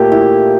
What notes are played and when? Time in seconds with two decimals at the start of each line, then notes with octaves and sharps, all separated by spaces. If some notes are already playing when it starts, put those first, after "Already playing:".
Already playing: A#2 A3 G4
0.12 E4